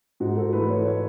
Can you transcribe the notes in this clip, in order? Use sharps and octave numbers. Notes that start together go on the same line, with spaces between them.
G#2 F#4
A4
E3 A3 B4
C#5
C#5